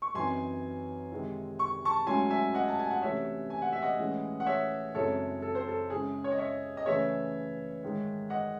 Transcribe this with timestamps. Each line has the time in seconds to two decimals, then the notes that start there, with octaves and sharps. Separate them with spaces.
0.02 C#6
0.14 F#2 E3 C4 D#4 G#5 C6
1.11 C3 D#3 G#3 C4 E4
1.59 C#6
1.85 A5 C#6
2.06 G#2 F#3 A3 C#4 E4 G#5 C6
2.30 E5 G#5
2.54 D#5 F#5
2.68 A5
2.79 G#5
2.91 F#5
3.02 C3 E3 A3 C#4 E4 C#5 E5
3.50 G#5
3.62 F#5
3.72 E5
3.82 D#5 F#5
3.98 A2 E3 G#3 C#4 E4
4.40 F#5
4.46 C#5 E5
4.95 F#2 C#3 G#3 C4 E4 A4 C#5
5.42 A4
5.55 C5
5.68 A4
5.90 C#3 G#3 C#4 E4 G#4
6.24 C#5
6.32 D#5
6.38 C#5 E5
6.77 D#5
6.86 C#3 E3 A3 C#4 C#5 E5
7.83 G#2 D#3 G#3
8.30 D#5 F#5